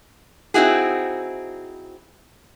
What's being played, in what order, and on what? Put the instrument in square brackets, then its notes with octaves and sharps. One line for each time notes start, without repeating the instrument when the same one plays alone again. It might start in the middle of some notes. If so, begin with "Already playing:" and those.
[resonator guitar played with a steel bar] C4 D#4 E4 F#4 G#4